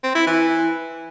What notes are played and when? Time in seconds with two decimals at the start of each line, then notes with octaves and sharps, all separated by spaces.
0.03 C4
0.15 E4
0.27 E3